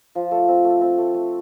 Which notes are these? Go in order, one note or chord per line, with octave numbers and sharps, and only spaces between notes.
F3 F4
A3 A4
C4
A3
C4
A3
A3